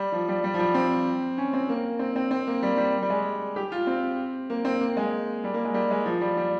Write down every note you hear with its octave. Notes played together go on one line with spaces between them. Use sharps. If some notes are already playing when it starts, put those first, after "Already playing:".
Already playing: G3
F3
G3
G3
F3
G3
C4
C#4
C4
A#3
C4
C4
C4
A#3
G3
G3
G3
G#3
G4
F4
C4
A#3
C4
A#3
G#3
G3
A#3
G#3
G3
G#3
F3
G3
G3